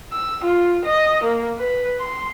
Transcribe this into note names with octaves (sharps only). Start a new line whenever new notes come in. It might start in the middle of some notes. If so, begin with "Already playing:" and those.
E6
F4
D#5
A#3
B4
C6